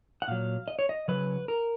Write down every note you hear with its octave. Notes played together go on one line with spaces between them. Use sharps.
F#5
A#2 F#3 F5
D#5
C#5
D#5
C#3 F#3 B4
A#4